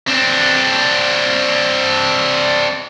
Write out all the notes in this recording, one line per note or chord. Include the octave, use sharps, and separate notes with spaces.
C4 D4